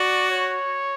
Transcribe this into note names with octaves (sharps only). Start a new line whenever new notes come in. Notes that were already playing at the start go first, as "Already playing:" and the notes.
Already playing: F#4 D5
C#5